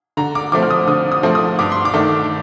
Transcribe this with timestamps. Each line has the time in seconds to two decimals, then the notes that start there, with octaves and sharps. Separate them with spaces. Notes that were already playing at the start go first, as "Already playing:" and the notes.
0.17 D3 A#5
0.35 D6
0.52 F3 A3 C4 D6
0.63 F6
0.71 D#6
0.87 D3 D#6
1.12 D#6
1.23 F3 A3 C4
1.35 D#6
1.59 G2 D6
1.72 C6
1.85 D6
1.94 D#3 A3 D4